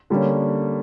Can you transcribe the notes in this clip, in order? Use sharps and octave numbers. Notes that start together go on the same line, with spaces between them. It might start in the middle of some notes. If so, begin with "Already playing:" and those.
D3 G3 A#3 C#4